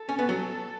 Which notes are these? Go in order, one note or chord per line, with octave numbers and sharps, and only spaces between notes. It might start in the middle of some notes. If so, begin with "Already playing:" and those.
Already playing: A4
C#4
B3
F#3